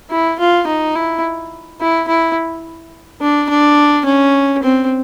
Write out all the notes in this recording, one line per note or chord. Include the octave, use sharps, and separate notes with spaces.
E4
F4
D#4
E4
E4
E4
D4
D4
C#4
C4